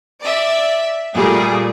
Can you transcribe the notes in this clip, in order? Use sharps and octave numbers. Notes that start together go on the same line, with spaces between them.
D5 E5
A#2 G3 A3 G#4